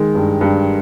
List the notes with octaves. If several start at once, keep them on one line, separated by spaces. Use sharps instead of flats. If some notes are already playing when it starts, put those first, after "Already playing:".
Already playing: D#3 G#3
G2
G2